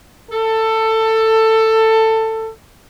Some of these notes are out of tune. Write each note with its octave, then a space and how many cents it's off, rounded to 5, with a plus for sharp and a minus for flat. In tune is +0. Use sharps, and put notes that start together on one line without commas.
A4 +15